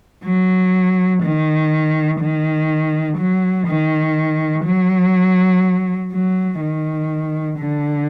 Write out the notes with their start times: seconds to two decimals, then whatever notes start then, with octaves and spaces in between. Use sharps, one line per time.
0.25 F#3
1.22 D#3
2.21 D#3
3.18 F#3
3.68 D#3
4.65 F#3
6.12 F#3
6.60 D#3
7.59 D3